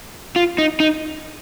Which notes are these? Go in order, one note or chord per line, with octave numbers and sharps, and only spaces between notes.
F4
D#4
D#4